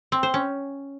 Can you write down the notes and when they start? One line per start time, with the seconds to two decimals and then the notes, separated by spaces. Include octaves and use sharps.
0.12 C4
0.23 C5
0.34 C#4